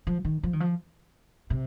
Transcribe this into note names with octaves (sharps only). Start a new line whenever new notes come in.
F3
D#3
F3
D#3
F3
C3